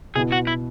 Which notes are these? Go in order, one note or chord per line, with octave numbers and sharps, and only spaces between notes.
B2 B3 E4 G#4
F#4
E4